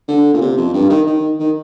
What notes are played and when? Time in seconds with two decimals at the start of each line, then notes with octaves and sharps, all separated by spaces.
0.08 D3
0.34 A#2
0.41 C3
0.57 F2
0.74 G2
0.90 D#3
1.07 D#3
1.39 D#3